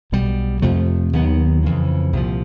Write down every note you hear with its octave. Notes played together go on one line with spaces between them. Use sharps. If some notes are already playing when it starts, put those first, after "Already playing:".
B1 B2 G3
F2 C3 F3 A3
D#2 D#3 F#3 B3
F2 C#3 E3
C2 A#2 F3